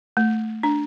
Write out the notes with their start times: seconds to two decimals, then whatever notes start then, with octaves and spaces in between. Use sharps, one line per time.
0.17 A3
0.63 D4